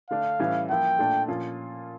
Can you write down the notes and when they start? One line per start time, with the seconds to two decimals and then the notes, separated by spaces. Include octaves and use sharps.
0.10 D3 A3 D4 F5
0.39 A2 E3 G3 C#4 E4
0.70 F3 A#3 E4 G5
0.99 A#2 A3 D4
1.28 A#2 F3 C#4 F4